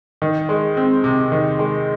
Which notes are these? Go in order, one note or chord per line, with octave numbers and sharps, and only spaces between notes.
D#3
G#3
C4
C3
D#3
G#3